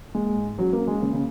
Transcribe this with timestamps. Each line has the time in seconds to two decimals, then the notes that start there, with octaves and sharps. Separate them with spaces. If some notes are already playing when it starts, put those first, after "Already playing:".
0.14 G#3 A#3
0.36 G#2
0.58 F#3 C#4
0.73 A#3
0.81 C#4
0.87 G#3
1.02 C#3 A#3
1.13 C#3